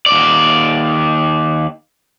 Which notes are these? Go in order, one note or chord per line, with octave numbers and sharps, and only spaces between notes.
D#2 D5